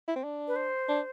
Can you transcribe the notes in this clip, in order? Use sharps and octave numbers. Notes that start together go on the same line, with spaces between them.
E4
C4
D4
B4
C5
D4